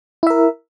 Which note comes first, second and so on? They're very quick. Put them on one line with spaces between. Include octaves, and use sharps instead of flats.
E4 E5 A#4